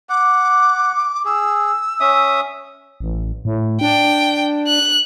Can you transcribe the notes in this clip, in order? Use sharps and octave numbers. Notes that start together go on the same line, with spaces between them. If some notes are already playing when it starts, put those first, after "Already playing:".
F#5 D6
G#4 E6
C#4 E5 D#6
A1
A2
D4 G5
F#6